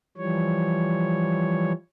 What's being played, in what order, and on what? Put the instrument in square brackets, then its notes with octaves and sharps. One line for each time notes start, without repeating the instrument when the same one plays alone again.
[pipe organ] E3 F3 G3 C#5